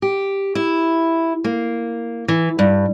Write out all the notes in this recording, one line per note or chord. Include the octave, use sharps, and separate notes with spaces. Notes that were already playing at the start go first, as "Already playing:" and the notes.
G4
E4
A#3
E3
G2